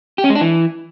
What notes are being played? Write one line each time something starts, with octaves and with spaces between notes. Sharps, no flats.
G4
C#4
G#3
D4
E3